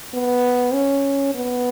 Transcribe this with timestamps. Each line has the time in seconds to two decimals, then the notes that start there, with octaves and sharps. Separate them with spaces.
0.14 B3
0.74 C#4
1.35 B3